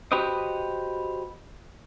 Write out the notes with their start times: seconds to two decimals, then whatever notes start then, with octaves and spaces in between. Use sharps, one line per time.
0.12 F#4 G4 B4 C5 D#5